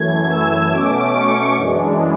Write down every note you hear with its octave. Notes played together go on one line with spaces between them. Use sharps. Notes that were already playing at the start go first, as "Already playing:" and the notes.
Already playing: F#2 E3 A3 G#6
E6
B2 A3 C#4 D6
C#6
F#2 E3 G#3 D4